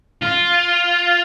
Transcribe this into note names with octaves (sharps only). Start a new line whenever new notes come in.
F4